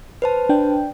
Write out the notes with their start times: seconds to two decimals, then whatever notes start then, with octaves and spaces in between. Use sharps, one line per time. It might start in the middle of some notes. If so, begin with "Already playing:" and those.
0.22 B4 C5 A5
0.49 D4 G5